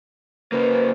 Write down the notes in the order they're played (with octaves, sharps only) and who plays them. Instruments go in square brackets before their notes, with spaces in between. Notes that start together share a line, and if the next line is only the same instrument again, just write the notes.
[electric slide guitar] C#3 A#3 [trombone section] B4 [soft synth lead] C5